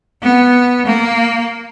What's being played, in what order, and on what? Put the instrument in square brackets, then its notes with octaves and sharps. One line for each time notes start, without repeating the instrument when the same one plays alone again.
[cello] B3
A#3